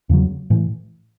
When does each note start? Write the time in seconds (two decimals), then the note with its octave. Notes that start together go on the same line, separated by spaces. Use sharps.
0.09 E2 C#3 F#3
0.50 A2 E3